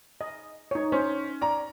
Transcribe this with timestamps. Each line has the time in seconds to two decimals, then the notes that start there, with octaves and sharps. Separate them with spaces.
0.21 D#5
0.71 D#4 C#5
0.92 C#4 C5
1.41 D5 A#5